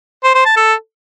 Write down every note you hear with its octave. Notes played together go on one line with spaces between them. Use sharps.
C5
C5
A5
A4